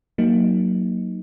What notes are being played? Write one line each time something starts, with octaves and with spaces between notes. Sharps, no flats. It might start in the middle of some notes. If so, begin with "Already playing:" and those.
F#3 A#3 D#4